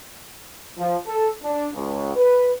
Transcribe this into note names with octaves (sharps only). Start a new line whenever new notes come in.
F3
A4
D4
C#2
B4